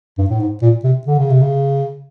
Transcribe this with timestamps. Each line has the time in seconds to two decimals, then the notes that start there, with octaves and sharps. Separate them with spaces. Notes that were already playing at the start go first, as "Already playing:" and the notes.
0.18 G2
0.30 A2
0.40 G#2
0.62 A#2
0.84 C3
1.07 D3
1.18 C#3
1.30 C3
1.41 C#3